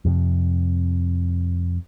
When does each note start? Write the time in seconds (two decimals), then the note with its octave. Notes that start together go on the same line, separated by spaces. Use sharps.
0.05 F2 C3